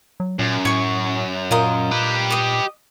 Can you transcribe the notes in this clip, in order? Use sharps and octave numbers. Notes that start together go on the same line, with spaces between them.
F#3
F#2 A#2
A2 C#5 C#6
A#2 F4 A#4 D#5
G4 B4
D#5 D6